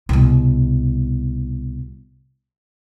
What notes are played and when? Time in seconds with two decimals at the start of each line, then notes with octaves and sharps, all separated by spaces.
0.09 C2 B2